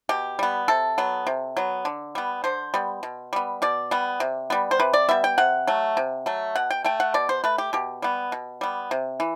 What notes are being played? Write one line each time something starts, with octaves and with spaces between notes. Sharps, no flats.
B2 G4
G3 B3
C3 A4
F#3 B3
C3
F#3 B3
D3
G3 B3
D3 C5
G3 B3
B2
G3 B3
B2 D5
G3 B3
C3
G3 B3
C5
C3 B4
D5
G3 B3 E5
G5
C3 F#5
F#3 A3
C3
F#3 A3
B2 F#5
G5
A3 G5
F#5
B2 D5
C5
A3 B4
G4
B2 G4
G3 B3
B2
G3 B3
C3
E3